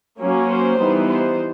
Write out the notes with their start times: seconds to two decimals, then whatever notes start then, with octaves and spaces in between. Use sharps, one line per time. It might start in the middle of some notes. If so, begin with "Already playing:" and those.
0.19 F#3 A#3 C#4
0.49 C5
0.78 E3 G3 B3 D#4
1.08 C5